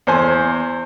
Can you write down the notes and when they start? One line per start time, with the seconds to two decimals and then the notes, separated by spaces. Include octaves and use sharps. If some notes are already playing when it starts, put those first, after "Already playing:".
0.07 E2 C5 G#5